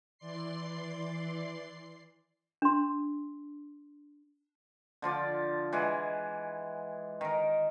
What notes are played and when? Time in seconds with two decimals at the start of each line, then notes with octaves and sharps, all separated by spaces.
0.18 E3 D5 C6 C7
2.62 D4 C6
5.02 D3 F3 F4 D5
5.73 E3 G#3 G#4 F#5
7.21 D#3 A#4